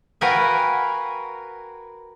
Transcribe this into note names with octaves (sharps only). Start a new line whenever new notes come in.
F#4 A#4 B4 F5 G5 G#5